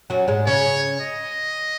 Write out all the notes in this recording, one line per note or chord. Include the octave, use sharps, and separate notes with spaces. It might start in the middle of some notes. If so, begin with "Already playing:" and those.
F#2 F#3
G#2 G#3
C#3 C#4 C#5
D#5